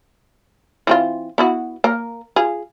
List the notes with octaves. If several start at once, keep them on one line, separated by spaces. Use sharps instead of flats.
E3 C4 F4
B3 E4 F#4
A#3 A#4
F4 G#4